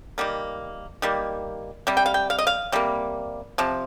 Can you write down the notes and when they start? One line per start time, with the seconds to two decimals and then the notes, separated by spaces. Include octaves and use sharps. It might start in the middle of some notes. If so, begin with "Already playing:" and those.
0.18 D#3 G3 A#3
1.02 D#3 G3 A#3
1.87 C3 G3
1.97 G5
2.06 F5
2.14 G5
2.30 F5
2.39 D#5
2.47 F5
2.72 C3 G3 A#3
3.58 C3 F3